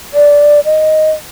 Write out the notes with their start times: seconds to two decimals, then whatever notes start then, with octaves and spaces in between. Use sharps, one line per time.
0.14 D5
0.65 D#5